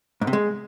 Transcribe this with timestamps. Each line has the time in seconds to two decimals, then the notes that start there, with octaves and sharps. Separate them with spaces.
0.21 G#2
0.27 C3
0.33 G#3